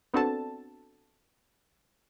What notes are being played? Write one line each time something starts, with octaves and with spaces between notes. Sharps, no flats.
B3 C4 D4 F#4 A4 A5